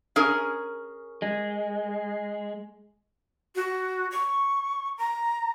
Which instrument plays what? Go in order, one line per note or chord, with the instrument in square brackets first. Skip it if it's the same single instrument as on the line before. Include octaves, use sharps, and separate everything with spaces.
[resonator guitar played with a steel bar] C#4 G#4 A#4
[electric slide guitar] G#3
[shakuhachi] F#4
C#6
A#5